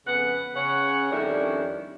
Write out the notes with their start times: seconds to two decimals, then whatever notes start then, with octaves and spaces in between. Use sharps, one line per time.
0.07 F2 C#3 B3 B4 F#5
0.56 C#3 C#5 F#5
1.11 F2 D#3 G3 C#4 D4 E4